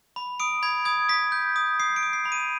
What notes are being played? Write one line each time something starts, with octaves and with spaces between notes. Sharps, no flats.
B5
D#6 D7
B5 G#6
D#6 G#6
D#6 B6
G6
D#6
D#6 C7
D7
D#6
C7
B5
D#7